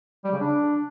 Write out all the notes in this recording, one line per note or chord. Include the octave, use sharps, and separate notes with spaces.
G3
C#3
D4